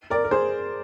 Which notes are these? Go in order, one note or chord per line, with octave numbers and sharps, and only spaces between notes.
A#4 D5
A#4
G#4 C5